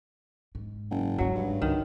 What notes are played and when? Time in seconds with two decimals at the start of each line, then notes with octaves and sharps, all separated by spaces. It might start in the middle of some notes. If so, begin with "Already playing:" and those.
0.55 G#2
0.90 F#1
1.18 G1 G#2 F#3
1.35 G2
1.62 C#2 D#3